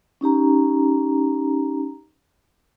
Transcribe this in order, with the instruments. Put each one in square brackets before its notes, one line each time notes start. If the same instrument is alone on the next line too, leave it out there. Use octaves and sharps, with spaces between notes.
[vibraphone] C#4 D#4 G4 A#5